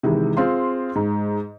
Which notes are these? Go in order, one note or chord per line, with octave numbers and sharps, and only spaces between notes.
C3 D#3 E3 G#3
C4 F4 G#4 C6
G#2